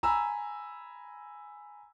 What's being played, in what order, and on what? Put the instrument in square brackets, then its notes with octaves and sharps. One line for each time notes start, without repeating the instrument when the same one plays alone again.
[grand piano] G#5 A#5 B5 E6